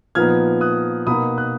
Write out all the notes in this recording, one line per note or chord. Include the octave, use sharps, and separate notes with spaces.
A#2 F3 B3 D#4 F6 G#6
D#6 F#6
B2 A#3 D#4 B5 D#6
D#6 F#6